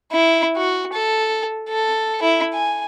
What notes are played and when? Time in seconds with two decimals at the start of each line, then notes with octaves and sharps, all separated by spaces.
0.12 E4
0.57 F#4
0.92 A4
1.69 A4
2.22 E4
2.54 G#5